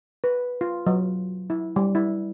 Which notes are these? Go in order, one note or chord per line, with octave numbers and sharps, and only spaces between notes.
B4
F4
F#3
E4
G3
E4